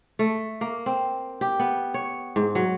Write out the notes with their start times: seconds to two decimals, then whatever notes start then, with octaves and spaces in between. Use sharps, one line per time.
0.19 A3
0.61 A#3
0.86 C4
1.41 G4
1.59 B3
1.94 C#5
2.36 G#2
2.55 F#3